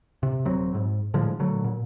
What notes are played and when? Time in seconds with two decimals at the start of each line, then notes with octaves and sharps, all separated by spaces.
0.23 C3
0.45 D#1 F#3 C4
0.74 G#2
1.14 A2 D3 F3 G#3
1.39 A#2 D3 F#3 A3
1.64 A#2